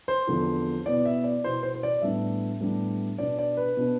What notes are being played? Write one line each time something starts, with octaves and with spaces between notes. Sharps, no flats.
C5
E2 D3 F3 C4
B2 B3 E4 D5
E5
D5
B2 B3 E4 C5
C5
C5
D5
A2 G3 B3 D4 E5
A2 G3 B3 D4
B2 B3 D4 D5
D5
B4
B2 B3 D4